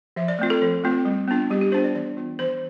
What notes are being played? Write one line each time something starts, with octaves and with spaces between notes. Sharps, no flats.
F3 E5
D5
A3 C4 F4
A4
F3
A3 C4 F4
G3
B3 D4 F4
G3 G4
G4
B3 D4 F4 C5
D5
E3 D5
B3 F4
E3 C5